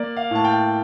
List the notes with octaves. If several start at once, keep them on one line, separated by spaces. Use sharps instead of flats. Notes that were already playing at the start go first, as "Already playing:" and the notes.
Already playing: A#3 D5
F5
A2 A5
G5